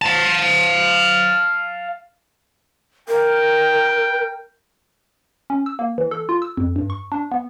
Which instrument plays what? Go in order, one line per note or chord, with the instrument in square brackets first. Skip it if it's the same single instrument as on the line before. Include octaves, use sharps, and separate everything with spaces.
[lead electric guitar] F5 A5
[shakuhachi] A#4 [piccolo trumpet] G5
[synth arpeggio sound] C#4
E6
A#3
E3
A4
F4
E6
F2
G2
C#6
D4
B3